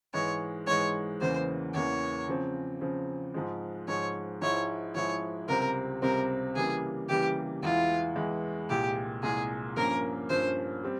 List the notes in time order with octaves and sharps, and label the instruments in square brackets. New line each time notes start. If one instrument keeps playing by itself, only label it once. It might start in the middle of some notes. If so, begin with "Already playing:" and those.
[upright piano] G#2 E3 G#3 [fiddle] C#5
[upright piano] G#2 E3 G#3 [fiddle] C#5
[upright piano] E2 C#3 E3 A#3 [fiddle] C5
[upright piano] E2 C#3 E3 A#3 [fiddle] C#5
[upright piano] C#3 F3 C4
C#3 F3 C4
G#2 F3 G#3
[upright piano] G#2 F3 G#3 [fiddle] C#5
[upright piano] G#2 F3 G#3 E4 [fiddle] C#5
[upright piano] G#2 F3 G#3 E4 [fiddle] C#5
[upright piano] C#2 C3 G3 C4 [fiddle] A#4
[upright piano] C#2 C3 G3 C4 [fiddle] A#4
[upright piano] C#3 E3 G3 A#3 [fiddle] G#4
[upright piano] C#3 E3 G3 A#3 [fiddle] G4
[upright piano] E2 E3 G#3 E4 [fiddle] F4
[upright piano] E2 E3 G#3 E4
[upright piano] C2 A#2 G#3 [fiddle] G4
[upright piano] C2 A#2 G#3 [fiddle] G#4
[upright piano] G2 F3 A#3 C#4 [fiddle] A#4
[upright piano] G2 F3 A#3 C#4 [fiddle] C5
[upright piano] G3 C4